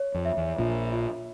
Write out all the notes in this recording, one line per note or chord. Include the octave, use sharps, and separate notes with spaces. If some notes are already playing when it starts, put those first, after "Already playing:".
Already playing: C#5
F2
E5
E2
A#1 A#2 F4
F4